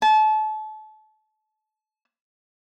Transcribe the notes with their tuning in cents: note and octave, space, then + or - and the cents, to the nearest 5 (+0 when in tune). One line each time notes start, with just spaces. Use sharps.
A5 -30